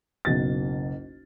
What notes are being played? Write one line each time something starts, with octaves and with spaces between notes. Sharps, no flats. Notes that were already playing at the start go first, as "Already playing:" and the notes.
F#1 B1 A6